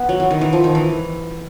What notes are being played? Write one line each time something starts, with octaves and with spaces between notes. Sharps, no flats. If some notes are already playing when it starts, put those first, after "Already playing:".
Already playing: B3
F#3
E3
D#3
E3
F3
D#3
E3